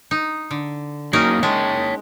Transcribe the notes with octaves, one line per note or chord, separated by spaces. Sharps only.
D#4
D3
F#3 A#3 C#4 D#4 A#4
G#3 C#5 G5 A5